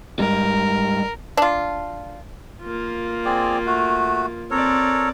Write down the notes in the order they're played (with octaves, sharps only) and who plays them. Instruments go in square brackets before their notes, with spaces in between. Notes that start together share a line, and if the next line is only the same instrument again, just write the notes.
[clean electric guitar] G#2 G3 [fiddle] A#4
[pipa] D4 F4
[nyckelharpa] A#3 F4
[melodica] C4 G#4 D5
A3 F#4
[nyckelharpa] C4 D5 [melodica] A4 A#4 C#5